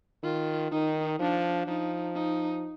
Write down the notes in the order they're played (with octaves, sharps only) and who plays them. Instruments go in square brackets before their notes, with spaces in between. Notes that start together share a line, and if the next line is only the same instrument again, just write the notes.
[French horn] D#3 [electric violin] F4
[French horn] D#3 [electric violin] D#4
[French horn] F3 [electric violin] D4
[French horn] F3 [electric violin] D#4
[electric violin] D#4